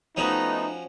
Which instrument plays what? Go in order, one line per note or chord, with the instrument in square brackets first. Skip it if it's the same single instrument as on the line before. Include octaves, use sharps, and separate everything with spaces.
[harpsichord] F3 C#4 F#4 [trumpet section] A3 B3 D#4